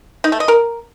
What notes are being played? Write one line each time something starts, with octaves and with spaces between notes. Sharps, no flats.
D#4
A3
D#5
A#4